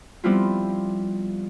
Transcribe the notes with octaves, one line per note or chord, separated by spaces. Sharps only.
F3 G3 B3 C4 E4 F4